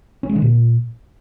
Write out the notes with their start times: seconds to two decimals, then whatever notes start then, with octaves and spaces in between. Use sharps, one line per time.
0.23 C#4
0.29 G#3
0.36 D3
0.42 A#2